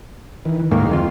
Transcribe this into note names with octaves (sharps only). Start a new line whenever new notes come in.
D#3 E3
D2 G#2 D#3 G#3 A#3 F5
F2 F4